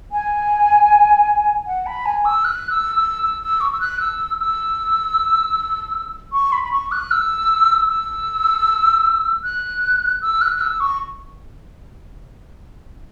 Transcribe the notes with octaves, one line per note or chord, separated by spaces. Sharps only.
G#5
F#5
B5
G#5
E6
F#6
E6
E6
E6
E6
C#6
E6
F#6
E6
E6
C#6
B5
B5
C#6
F#6
E6
E6
F#6
E6
F#6
F#6
E6
C#6